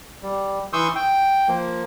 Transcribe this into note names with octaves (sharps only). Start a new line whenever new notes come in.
G3
E3 C6 C#6 D#6 E6 G6
G5
F3 A#3